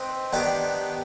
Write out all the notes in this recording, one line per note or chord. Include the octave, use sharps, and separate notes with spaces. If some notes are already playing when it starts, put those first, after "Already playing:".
Already playing: C4 D#4 B4 D#5
D#3 B3 D4 G4 B4